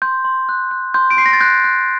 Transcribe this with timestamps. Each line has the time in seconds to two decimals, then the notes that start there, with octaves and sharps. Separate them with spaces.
0.02 C6 G6
0.25 C6
0.49 F#6
0.71 F#6
0.94 C6 G6
1.11 D7
1.17 C6 C7
1.26 A#6
1.33 A6
1.40 F#6 G6
1.64 F#6